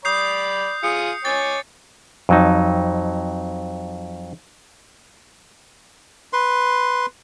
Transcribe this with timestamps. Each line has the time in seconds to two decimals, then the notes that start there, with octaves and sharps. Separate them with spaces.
0.05 D5 B5 D#6 G6 C7
0.83 F4 G#4 D#6 C#7
1.25 C#5 G#5 D6 A6
2.29 F2 F#3 D#4
6.33 B4 C6